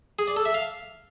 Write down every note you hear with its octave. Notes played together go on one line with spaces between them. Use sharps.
G#4
D5
A4
E5
F5